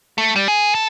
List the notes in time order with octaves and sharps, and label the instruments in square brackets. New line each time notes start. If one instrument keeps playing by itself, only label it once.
[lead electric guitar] A3
G3
G#4
A4